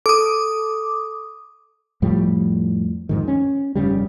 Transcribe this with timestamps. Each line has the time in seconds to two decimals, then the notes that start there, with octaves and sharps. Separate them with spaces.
0.06 A4 D6 D#6
2.02 F2 A2 F3 G3
3.09 F2 G#2 D#3
3.28 C#4
3.75 F1 G2 C#3 G3